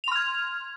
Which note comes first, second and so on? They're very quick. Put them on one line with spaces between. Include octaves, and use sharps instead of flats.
F7 C6 F6 G#6